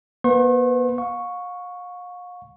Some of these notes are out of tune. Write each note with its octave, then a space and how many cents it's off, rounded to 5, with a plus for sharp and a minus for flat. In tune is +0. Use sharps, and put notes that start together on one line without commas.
B3 -45 B4 +35 C#6 -45
F5 +40 C#6 +0